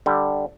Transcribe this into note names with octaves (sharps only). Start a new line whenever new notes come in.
D3 G3